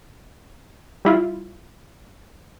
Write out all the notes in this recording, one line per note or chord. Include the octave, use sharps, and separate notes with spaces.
G3 E4 F4